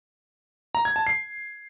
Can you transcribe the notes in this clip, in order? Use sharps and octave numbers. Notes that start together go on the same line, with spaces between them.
A#5
G#6
A5
C7